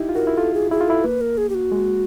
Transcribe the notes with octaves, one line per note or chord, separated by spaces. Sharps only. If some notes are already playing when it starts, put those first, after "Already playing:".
Already playing: D#4 E4 G4
F4
F#4 A#4
E4
F4 A4
G#4
E4 G#4
F4
E4 A4
A#3 B4
A#4
G#4
G4
F#4
G#3